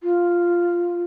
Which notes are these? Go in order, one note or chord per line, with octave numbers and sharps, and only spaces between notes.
F4